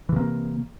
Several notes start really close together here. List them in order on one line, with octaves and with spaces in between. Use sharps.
E3 C3 A#3